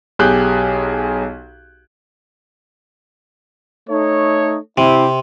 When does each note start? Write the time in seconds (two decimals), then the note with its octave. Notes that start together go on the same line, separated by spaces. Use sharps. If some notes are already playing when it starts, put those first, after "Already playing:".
0.19 B1 G4 G#4 F#6 G6
3.89 A3 D#4 C#5
4.78 C3 C4 E4 G4